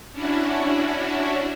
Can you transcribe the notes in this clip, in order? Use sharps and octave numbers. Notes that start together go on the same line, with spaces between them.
C#4 D4 E4 F#4